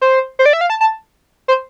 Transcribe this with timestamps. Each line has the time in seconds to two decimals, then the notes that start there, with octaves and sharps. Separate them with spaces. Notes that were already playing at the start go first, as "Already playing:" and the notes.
0.01 C5
0.39 C5
0.46 D5
0.53 E5
0.61 F5
0.70 A5
0.81 A5
1.48 C5